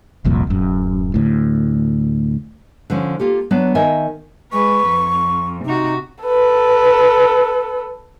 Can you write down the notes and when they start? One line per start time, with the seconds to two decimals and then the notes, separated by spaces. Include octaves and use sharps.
0.25 D#1 C2 F2 A#2
0.47 D1 F#2
1.14 D2 A2
2.90 D3 F3 C#4
3.19 A#3 F4 G4 A4
3.51 F#3 B3 D4
3.75 D#3 A#4 D#5 E5 G#5
4.52 G#3 B4 C#6
4.87 F2
5.65 C3 D#4 F#4
6.24 A4 B4